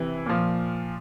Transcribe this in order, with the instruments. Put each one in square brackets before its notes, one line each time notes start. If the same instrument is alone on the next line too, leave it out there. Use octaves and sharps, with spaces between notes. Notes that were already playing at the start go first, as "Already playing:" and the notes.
Already playing: [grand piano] C3 E3
A#2 F3